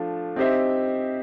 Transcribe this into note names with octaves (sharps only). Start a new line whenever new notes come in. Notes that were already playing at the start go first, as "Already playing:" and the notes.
Already playing: F3 A3 D4 F4
C4 D#4 G4 C5 E5